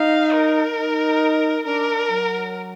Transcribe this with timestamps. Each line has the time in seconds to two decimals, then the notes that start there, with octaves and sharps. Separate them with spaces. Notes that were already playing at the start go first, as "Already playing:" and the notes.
Already playing: D#4 F5
0.33 A#4
0.77 D#4
1.65 D4 A#4
2.10 F#3